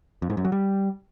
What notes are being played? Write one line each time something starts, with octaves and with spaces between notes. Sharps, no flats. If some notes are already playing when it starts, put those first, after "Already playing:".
F2
G#2
F#2
F#3
G3